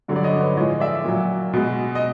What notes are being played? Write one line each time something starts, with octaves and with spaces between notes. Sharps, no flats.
G2 D3 F#3
D5
C#5 D#5
B4 C#5
A2 F3 G#3 C#5 D#5
D5 E5
A#2 F#3
B2 G#3
D#5